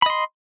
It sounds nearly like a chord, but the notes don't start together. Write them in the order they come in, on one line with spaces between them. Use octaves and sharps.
B5 D#5 C6